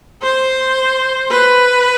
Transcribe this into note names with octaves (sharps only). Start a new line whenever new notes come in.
C5
B4